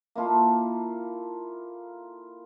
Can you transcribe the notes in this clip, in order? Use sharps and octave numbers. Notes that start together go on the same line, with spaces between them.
A#3 E4 F4 A4